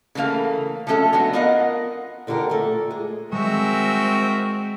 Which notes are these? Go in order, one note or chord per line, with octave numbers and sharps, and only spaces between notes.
C#3 E3 A3 A#3 F5
F3 F#3 A3 C#4 A4 E5
G#3 A3 B3 D4 F#4
B3 F4 A#4 D#5 F5 F#5
F2 D3 G4 A4 A#4
A#2 A3
G#3
G#3 C4 F#4 A#4 E5